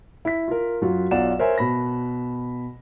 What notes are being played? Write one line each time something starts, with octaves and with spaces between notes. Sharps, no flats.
E4 B6
F4 A#4
F#2 F#3 F4 F#4
B1 F4 D5 F5 F#5 E7
A#4 C5 C#5 E5 G#5
B2 B5 A#6